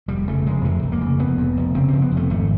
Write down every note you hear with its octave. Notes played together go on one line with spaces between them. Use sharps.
F1 G3
C#3 A3
F1 G#3
F2 A3
F1
A#3
C#3
F1 B3
F2
F1
C#3 C4
F1 C4
B3
F2
A3
G#1 A3